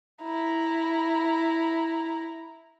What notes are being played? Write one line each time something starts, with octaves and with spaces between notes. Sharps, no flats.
E4 A#5